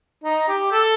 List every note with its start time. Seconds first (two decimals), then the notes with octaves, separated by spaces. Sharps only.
0.24 D#4
0.48 G4
0.72 A4